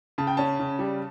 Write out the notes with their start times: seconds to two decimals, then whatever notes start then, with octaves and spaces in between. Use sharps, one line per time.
0.18 C#3 A5
0.27 G5
0.37 C#4 A5
0.60 C#3
0.79 G3